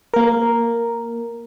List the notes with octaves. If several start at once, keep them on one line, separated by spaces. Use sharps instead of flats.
A#3 A#4